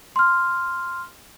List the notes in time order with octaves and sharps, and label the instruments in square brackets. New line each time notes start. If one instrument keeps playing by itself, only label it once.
[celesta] C6 F6